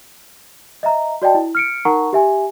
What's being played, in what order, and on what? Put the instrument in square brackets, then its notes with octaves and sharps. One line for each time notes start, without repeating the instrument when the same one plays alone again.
[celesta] D#5 E5 A#5
F#4 D5 D#5 G5 A5
E4
F6 C#7 D7
D#4 A#4 F#5 A#5 C#6
G4 E5 G#5